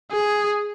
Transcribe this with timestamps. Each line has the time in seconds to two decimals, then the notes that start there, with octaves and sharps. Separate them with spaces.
0.11 G#4